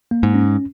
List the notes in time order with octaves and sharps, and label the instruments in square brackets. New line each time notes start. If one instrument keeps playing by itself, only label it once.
[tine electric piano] A#3
[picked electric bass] G#2
[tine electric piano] C#4